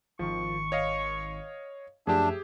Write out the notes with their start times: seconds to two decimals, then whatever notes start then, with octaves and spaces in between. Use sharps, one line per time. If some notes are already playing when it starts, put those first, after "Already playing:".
0.19 G#1 D#3 F3 C#6
0.72 C#5 D#5 F5
2.07 F#2 F3 A3 D4 G4 G#4 E5